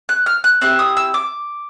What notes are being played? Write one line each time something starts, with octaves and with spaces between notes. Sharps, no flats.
F#6
F6
F#6
C4 E4 G4 F#6
D#6
E6
D6